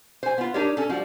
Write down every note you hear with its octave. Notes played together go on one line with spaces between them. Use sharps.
C5 G#5
B3 F4
D4 D#4 G4 A#4 C#5
C#4 A4
F3 G3 F#4